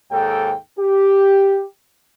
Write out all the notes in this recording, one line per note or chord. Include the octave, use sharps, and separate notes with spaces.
D#2 G#2 A4 G5
G4